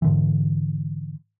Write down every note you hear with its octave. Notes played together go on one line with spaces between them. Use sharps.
G#2 D3 E3